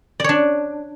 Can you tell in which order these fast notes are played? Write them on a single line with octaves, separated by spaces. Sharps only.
D5 C#5 D4